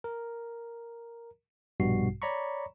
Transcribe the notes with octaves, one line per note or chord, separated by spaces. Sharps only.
A#4
A#1 G2 B2 G3 F#4 C7
C#5 D5 A#5 B5 C#6